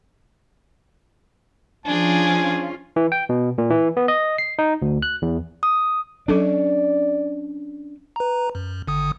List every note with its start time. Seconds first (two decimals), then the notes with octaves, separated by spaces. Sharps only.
1.86 F3 C#4 D4 F4 G#4 G#5
2.96 E3
3.12 G5
3.29 B2
3.58 A#2
3.71 E3
3.97 B3
4.08 D#5
4.38 C7
4.59 D#4
4.82 D2
5.02 F#6
5.22 E2
5.63 D#6
6.28 F#3 C#4 D4 A4 D5 D6
8.16 B4 A#5
8.55 F#2
8.88 G#1 D3 D#6